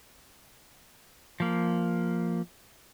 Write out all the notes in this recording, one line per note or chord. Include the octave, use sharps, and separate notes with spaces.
F3 A#3